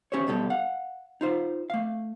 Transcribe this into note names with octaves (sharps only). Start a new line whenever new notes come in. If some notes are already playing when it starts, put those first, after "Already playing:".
C#4 G4 C5 C#5
B1 B2 G3 A4
F5 F#5
D#4 F4 C5
A3 F5